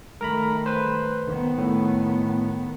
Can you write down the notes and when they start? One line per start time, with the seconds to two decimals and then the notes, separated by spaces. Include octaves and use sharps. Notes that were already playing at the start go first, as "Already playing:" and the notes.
0.21 D#3 A3 A#4 A#5 B5
0.66 B4 C5
1.27 D#3 B3
1.58 A2